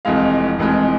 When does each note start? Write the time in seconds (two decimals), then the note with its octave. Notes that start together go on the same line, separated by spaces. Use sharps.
0.05 F1 F2 E3 G#3 F5
0.59 F1 F2 E3 G#3